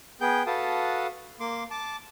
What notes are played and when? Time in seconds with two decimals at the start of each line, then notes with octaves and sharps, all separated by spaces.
0.21 B3 G#4 G5 G6
0.47 F#4 A4 B4 F5 A5 D#6
1.40 A#3 C6 D6
1.71 A5 D6